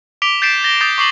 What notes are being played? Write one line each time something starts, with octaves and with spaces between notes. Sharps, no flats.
D6 B6 D7 F7 G7
G6 A6 B6 C7 D7 E7
A6 A#6 G7
D6 D#6 G6 A6 C7
C#6 D6 C7 F#7